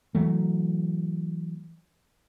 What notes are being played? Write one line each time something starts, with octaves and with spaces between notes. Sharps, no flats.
E3 F#3 A3